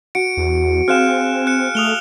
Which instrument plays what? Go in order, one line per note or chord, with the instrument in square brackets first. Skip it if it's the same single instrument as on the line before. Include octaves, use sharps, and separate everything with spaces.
[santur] F#4 [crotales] C#7 D7
[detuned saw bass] E2
[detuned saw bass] C4 [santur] G#4 F5 [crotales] F6 F#6 E7
[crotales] F#6 C#7
[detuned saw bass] A3 [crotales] D#6 F7 G7